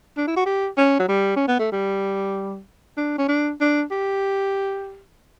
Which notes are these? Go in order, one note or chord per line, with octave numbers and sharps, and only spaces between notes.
D4
E4
F#4
G4
C#4
F#3
G3
C#4
B3
A3
G3
D4
C#4
D4
D4
G4